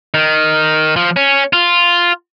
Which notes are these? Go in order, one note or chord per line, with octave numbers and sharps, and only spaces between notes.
D#3
F3
C#4
F4